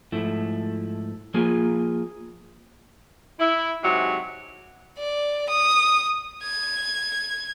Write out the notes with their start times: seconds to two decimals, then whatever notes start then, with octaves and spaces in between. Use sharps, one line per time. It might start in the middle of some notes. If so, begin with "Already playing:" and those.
0.12 G#2 F3 A3 E4
1.34 F3 A#3 F4 G#4
3.38 E4
3.82 G#2 C3 F#3
4.98 D5
5.49 D#6
6.43 G#6